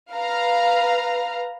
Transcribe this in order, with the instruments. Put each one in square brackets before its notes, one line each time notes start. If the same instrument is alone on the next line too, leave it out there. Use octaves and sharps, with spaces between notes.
[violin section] B4 F5 A#5